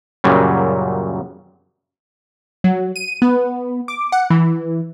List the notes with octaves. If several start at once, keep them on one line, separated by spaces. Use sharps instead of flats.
F#2 A#2 C#3 F#3 G3
F#3
D#7
B3
D6
F#5
E3